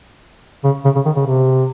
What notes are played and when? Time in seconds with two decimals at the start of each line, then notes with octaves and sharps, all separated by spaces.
0.64 C#3
0.85 C#3
0.95 C#3
1.06 D#3
1.16 C#3
1.26 C3